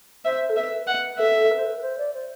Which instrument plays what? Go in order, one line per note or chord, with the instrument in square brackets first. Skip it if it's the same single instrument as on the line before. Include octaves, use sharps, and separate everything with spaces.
[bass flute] C5 [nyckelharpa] E5
[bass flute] A4
[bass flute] B4 [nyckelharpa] E5
[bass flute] B4 [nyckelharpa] F#5
[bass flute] A4 [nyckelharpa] E5
[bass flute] B4
C5
B4
B4
C5
D5
C5